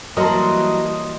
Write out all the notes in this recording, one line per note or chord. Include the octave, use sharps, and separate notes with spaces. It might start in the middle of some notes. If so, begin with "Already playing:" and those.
E3 F#3 G3 A#3 A#4 D#5 A5 C6